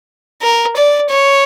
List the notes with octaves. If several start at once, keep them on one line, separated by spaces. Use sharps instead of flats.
A#4
D5
C#5